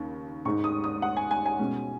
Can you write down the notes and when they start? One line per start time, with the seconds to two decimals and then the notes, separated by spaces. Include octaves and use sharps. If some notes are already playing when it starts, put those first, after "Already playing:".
Already playing: D#2 C#3
0.45 G#2 G#3 D#4 C#6
0.64 D#6
0.84 D#6
1.02 F#5
1.17 G#5
1.31 G#5
1.46 G#5
1.59 B2 G#3 C#4